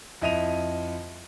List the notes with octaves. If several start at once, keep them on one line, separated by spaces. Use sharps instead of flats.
F2 E4 D#5 E5 D#7 F7